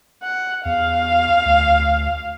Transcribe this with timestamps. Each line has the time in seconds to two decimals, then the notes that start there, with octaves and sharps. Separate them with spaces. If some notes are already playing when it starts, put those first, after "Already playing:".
0.23 F#5
0.65 E2 F5
1.45 D2